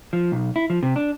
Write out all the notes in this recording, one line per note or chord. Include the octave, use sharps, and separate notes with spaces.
F3
B1
E4
F3
C3
D4